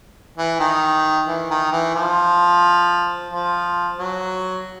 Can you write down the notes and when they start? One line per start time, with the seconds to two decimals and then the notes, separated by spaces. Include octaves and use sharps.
0.38 E3
0.59 D#3
1.28 E3
1.51 D#3
1.72 E3
1.95 F3
3.30 F3
3.98 F#3